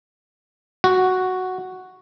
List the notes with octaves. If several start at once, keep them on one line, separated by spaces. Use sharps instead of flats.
F#4